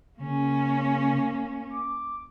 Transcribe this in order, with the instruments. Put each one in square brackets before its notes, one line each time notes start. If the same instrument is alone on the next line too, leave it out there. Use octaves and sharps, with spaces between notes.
[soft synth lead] C#3 [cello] A#3 C#4
[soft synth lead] D6